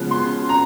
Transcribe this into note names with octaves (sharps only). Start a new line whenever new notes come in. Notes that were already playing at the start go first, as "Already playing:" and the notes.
Already playing: C#3 F3 G#3 B3
C6
A#5